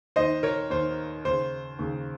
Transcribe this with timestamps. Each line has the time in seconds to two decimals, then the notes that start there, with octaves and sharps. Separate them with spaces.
0.16 D#2 D#3 C5 D#5
0.43 A#4 C#5
0.70 D#2 D#3 C5
1.25 D#2 C#3 C5
1.79 D#2 C#3